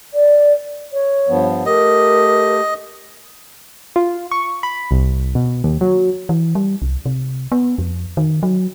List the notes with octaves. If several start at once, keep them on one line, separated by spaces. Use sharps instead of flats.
D5
C#5
G2 F3 B3
A3 G4 A#4 D#5
F4
C#6
B5
C2
B2
D#2
F#3
E3
G3
C2
C3
B3
F2
D#3
F#3